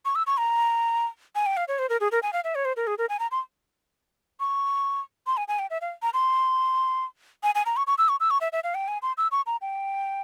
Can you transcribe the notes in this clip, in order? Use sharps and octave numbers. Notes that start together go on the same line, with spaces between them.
C#6
E6
C#6
A#5
G#5
G5
F5
C#5
C5
A#4
G#4
A#4
G#5
F5
E5
C#5
C5
A#4
G#4
A#4
G#5
A#5
C6
C#6
C6
G#5
G#5
G5
E5
F5
A#5
C6
G#5
G#5
A#5
C#6
C#6
E6
C#6
E6
C#6
E5
E5
F5
G5
G#5
C6
E6
C#6
A#5
G5